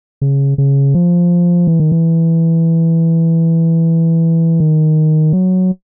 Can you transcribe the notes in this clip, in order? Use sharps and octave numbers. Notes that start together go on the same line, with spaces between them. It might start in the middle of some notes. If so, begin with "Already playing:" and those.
C#3
C#3
F3
E3
D#3
E3
D#3
F#3